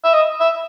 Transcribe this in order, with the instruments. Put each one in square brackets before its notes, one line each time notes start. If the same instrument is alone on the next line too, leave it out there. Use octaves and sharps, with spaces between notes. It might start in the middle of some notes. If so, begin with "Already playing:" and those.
[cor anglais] E5
D#5
E5